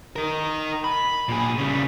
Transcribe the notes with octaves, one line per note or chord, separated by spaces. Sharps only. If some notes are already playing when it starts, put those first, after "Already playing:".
D#4 A#4
B5
A#2 G#4
C#3 G3